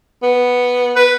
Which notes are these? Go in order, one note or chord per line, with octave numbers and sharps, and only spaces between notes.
B3
B4